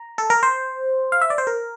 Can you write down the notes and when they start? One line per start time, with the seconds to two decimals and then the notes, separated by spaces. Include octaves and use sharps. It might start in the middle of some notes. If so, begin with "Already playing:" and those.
Already playing: A#5
0.18 A4
0.30 A#4
0.43 C5
1.12 F5
1.21 E5
1.30 D5
1.38 C5
1.47 A#4